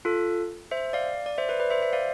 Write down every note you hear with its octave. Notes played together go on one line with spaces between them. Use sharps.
F4 A4
C5 E5
D5 F5
D5
C5 E5
B4 D5
B4 D5
C5 E5
C5 E5
D5 F5